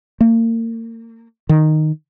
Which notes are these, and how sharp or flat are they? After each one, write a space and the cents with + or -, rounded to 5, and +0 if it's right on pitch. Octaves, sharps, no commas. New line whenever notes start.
A#3 -35
D#3 -10